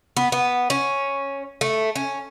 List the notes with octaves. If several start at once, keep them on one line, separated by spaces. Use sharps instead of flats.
B3
B3
C#4
A3
C#4